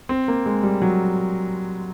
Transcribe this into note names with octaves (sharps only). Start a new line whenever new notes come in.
C4
A#3
G#3
G3
F#3